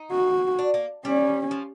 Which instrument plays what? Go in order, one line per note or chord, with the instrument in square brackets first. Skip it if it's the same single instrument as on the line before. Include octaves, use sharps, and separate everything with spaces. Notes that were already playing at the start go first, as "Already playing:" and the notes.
Already playing: [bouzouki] D#4
[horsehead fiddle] F#4
[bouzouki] D4
A#3
[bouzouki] G3 [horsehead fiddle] C#4
[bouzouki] F3